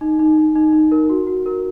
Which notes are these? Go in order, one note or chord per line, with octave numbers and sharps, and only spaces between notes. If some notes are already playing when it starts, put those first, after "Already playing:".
D#4
D#4
D#4
D#4
D#4
A#4
F#4
F#4
A#4